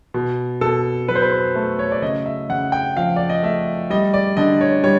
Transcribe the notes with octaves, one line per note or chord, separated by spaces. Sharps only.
B2
B2 A4
F#3 B4
C5
B4
C5
A3
C#5
D5
C#3 D#5
E5
C#3 F#5
G5
F3 F5
D5
D#5
A3 E5
G3 D#5
D5
D3 D#5
C#5
G3 C#5